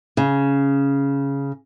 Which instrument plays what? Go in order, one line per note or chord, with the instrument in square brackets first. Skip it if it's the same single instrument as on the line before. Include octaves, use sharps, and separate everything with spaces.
[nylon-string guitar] C#3